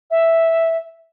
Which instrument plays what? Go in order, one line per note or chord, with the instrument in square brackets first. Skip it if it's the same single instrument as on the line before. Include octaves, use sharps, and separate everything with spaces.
[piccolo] E5